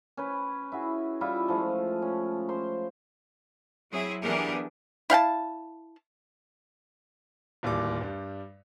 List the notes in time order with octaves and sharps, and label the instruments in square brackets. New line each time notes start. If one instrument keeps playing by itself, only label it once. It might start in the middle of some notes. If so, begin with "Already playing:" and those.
[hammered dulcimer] C#4 B4
E4 F#4 G#4
G3 E4 F4 E5
F3 G#3 A3
C#4
C5 C6
[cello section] F#3 C4 E4 G#4
E3 B3 D4 G4 G#4 A#4
[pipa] E4 F5 G5 A5
[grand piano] D1 D#2 G3 D6
G2 G3